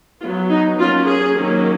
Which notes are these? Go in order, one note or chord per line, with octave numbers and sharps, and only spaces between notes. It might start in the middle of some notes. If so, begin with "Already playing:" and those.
F#3 B3 F4
D#4
F#3 A#3 C#4 F4
G#4
D#3 F#3 A#3 C#4